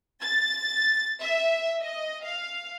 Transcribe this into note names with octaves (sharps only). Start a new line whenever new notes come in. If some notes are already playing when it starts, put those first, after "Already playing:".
A6
E5
D#5
F5